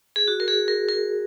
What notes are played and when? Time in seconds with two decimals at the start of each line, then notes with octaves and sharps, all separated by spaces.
0.16 G#4
0.28 F#4
0.40 A#4
0.48 G#4
0.68 A#4
0.89 A#4